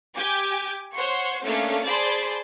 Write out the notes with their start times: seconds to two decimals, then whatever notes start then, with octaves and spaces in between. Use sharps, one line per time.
0.16 G4 G#5 D6 G6
0.94 C5 C#5 F#5 C6 C#6
1.43 A3 A#3 C#4 D4 F5
1.84 G#4 C5 D5 A5 B5 C6